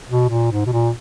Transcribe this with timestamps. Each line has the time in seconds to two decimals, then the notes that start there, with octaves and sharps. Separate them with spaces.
0.09 B2
0.30 A#2
0.52 G#2
0.66 B2
0.73 A#2